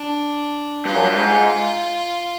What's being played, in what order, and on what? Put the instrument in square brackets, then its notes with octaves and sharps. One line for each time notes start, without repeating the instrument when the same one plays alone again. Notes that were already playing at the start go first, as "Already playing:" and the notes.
Already playing: [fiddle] D4
[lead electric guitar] G2 [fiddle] F4
[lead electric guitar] F#2
G2
G#2